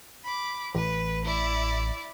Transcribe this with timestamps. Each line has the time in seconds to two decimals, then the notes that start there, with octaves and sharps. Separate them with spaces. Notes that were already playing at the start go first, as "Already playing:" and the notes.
0.24 B5 D6
0.75 A1 B4
1.25 E4 D5